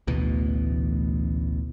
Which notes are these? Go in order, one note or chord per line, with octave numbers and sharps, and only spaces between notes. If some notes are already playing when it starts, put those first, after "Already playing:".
A1 D2 B2 E3